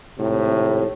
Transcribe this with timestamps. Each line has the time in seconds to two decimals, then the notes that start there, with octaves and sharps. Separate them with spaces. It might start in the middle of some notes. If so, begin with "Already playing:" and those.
0.19 G#1 A2 C3